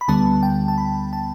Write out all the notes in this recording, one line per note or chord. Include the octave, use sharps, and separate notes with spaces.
B5
D2 D3 G3 B3 A5
G5
A5
B5
A5